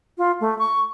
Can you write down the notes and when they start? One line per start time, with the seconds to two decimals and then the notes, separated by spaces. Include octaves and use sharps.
0.18 F4
0.40 A3
0.59 C#6